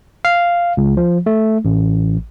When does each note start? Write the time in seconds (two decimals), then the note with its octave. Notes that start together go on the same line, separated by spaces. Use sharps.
0.25 F5
0.77 C#2
0.97 F3
1.26 A3
1.65 A1